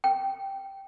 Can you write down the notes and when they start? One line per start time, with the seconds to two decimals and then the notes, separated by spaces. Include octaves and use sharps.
0.04 G5